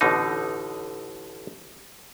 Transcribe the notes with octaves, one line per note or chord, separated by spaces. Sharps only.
A1 B2 D3 D#4